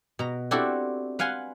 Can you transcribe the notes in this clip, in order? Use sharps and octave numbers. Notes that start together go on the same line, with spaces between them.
B2 A#5
C4 D4 E4 F#4 G4 A4
B4 F5 F#5 G#5 C6